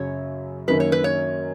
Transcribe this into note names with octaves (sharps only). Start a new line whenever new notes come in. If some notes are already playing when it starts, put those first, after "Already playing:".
Already playing: F#2 C#3 F#3 C#5
F#2 D#3 A#3 C#4 B4
C#5
B4
C#5